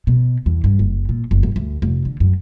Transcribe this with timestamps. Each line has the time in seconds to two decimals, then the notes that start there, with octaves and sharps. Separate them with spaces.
0.07 B2
0.46 E2
0.64 G2
0.79 F#1
1.09 A#2
1.31 F#1
1.43 F#2
1.56 D2
1.82 F1
2.05 D3
2.20 F#2